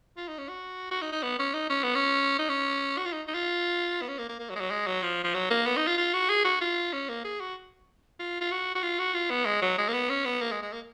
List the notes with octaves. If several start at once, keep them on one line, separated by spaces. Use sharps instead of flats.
F4
D#4
C#4
F#4
F#4
D#4
D#4
B3
C#4
D#4
C#4
B3
C#4
D#4
C#4
F#4
F4
D#4
D#4
F4
B3
C#4
A#3
A#3
A#3
F#3
G#3
F#3
G#3
F#3
F3
F3
F#3
A#3
B3
D#4
F4
F4
F#4
G#4
F#4
F4
C#4
A#3
G#4
F#4
F4
F4
F#4
F#4
F4
F#4
F4
B3
G#3
F#3
G#3
A#3
B3
C#4
B3
A#3
G#3
G#3
A#3